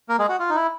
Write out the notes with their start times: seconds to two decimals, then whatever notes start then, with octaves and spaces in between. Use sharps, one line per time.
0.09 A#3 A#4
0.19 G#3 G#4
0.29 F#4
0.39 F4
0.50 D#4
0.56 E4